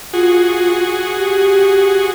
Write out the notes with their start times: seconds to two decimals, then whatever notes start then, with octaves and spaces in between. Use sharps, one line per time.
0.13 F4 F#4 G#4
1.18 G4